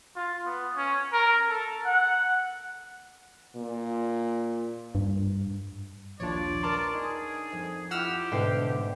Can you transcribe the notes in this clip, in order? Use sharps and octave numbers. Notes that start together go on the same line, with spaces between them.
F4
B3
C#4
A#4
A4
F#5
A#2
G2
A#1 D#2 D4 F4 C#5 D5
A#4 A5 A#5 C6 D6 F6
D#4 G#4
F2
E4 F4 G4 F#5 E6 F6
G#2 B2 D3 C5 E5 G5 C7